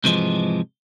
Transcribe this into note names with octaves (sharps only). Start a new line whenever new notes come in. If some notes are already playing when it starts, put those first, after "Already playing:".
G#2 C3 E3 F3 G#3